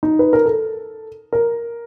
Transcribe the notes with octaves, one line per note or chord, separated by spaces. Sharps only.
D#4
B4
A#4
A4
A#4